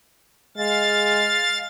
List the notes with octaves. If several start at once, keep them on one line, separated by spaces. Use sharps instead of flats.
G#3 F5 A6